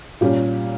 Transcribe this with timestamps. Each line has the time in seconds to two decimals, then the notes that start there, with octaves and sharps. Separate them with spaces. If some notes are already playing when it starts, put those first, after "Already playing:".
0.21 A#2 G3 C#4 G4